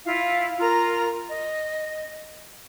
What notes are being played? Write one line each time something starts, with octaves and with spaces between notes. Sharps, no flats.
E4 F4 F5
F4 A#4 A#5
D#5